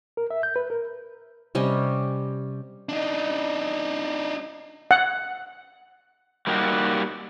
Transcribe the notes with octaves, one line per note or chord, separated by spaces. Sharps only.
A#4
E5
G6
B4
A#4
C3 G3 C#4 D#5
D4 D#4
F#5
G3 A#3 D#4 F#4 G4